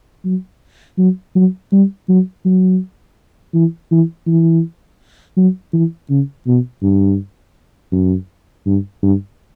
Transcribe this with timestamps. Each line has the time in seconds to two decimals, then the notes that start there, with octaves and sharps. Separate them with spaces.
0.25 F#3
0.98 F#3
1.35 F#3
1.72 G3
2.08 F#3
2.45 F#3
3.54 E3
3.91 E3
4.27 E3
5.37 F#3
5.73 E3
6.09 C#3
6.47 B2
6.82 G2
7.92 F#2
8.66 G2
9.02 G2